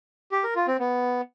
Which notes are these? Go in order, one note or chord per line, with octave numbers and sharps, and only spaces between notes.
G4
A#4
F4
C4
B3